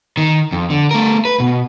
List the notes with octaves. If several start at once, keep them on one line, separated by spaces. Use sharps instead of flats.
D#3
F2
D3
A3 A#4
B4
B2